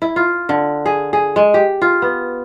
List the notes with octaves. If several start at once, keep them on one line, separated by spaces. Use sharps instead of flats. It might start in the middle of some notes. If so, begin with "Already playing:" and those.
E4
F4
D3
G#4
G#4
G#3
G4
F4
B3